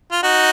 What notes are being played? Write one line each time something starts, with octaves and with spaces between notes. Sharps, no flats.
F4
D#4 F#4